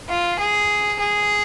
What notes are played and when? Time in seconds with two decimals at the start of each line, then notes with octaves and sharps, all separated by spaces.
0.09 F4
0.39 G#4
0.99 G#4